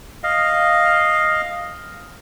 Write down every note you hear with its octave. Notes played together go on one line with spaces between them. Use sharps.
D#5 F5